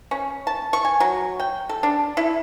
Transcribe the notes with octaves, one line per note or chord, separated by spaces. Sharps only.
C#4
A5
C#6
G#5
F#3
G5
A4
D4
E4